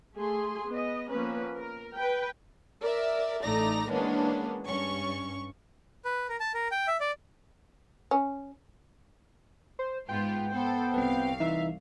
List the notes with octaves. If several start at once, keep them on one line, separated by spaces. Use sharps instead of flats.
A3 G#4 C6
B3 D#5
F3 A#3 B3 C#4 B4
A#4
B4 G5
A#4 D5 E5
A1 A3 D#4 D5 A#5 A#6
E3 G#3 A#3 B3 C#4 D4
G2 C#4 C#6
B4
A#4
A5
A#4
G5
E5
D5
C#4
C5
G#2 B3 F4 G5
B3 A4 C5
C2 C4 B4 F5
E3 D#4 E5